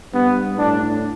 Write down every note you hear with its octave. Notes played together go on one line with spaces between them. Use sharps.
G2 B3
A2 D4